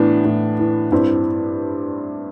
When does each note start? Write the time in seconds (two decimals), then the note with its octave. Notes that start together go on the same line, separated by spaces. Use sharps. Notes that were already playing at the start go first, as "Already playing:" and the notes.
Already playing: A2 E3 B3 D4
0.25 A2
0.59 E3
0.92 G2 C4 E4